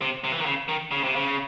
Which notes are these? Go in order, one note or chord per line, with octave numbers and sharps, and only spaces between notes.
C3
C3
E3
D#3
C#3
D#3
C#3
C3
C#3